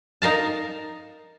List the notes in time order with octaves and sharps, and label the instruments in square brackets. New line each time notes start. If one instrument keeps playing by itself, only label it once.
[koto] D#4 A#4 F5 A5